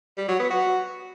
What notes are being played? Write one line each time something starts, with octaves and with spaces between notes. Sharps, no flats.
G3
F#3
B3
F#4